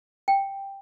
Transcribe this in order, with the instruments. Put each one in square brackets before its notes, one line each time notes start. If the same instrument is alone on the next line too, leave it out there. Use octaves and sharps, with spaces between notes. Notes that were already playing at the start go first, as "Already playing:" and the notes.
[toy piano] G5